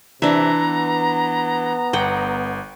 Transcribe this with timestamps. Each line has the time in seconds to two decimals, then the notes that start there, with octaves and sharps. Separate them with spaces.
0.22 C3 E3 D4 E5 A#5
0.61 B3
1.93 G1 F#5 G5